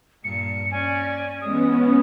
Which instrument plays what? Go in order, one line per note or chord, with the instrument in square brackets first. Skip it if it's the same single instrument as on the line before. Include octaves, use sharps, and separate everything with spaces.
[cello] G2 A#2 [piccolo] C#7
[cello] C#4 D5 [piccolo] G#5
[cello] E3 G#3 [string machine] B3 C#4 [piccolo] D#6